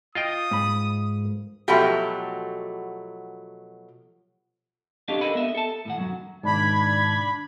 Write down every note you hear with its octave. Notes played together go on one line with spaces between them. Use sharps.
F4 D#5 G5 D#6
G#2 B5
B2 F3 F#3 A3 F#4 G4
C#4 D4 G4 A4 D#5 F5
A4 A#4 D#5 B5
B3 D#5 E5
A4 A5
A2 D#3 F#5
F#2 C3 F#3
G#2 B2 D#3 D4 B5 G#6